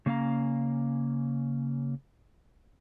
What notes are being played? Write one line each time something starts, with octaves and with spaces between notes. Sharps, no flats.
C#3 A#3 C#4 F5 A#5